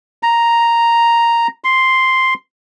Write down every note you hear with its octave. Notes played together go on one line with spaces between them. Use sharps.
A#5
C6